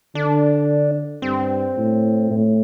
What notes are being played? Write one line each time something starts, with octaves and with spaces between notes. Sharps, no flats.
D3 D4
G2 C4
A2
A2